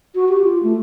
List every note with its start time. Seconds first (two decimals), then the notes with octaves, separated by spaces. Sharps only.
0.15 F#4
0.29 G4
0.44 F4
0.63 A3